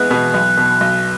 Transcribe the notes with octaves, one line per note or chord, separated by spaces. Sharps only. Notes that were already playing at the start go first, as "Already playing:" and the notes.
Already playing: E2 G#3 B3 F#6
B2
B1
B2
B1